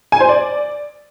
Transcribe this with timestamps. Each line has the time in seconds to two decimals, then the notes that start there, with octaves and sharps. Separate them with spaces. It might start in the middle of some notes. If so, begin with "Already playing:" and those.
0.12 G#5
0.20 C5
0.29 D5